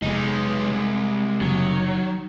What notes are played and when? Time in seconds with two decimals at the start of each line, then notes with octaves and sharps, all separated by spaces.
0.02 F1 G#3 B3 D#4
0.68 C2
1.41 F#1 D#3 F#3